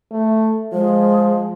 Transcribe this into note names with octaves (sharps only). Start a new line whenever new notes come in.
A3
F3 G#3